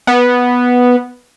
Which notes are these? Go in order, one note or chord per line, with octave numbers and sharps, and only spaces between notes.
B3